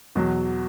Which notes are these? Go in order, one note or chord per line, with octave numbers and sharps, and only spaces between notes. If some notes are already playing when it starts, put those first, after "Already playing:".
E2 B2 F#3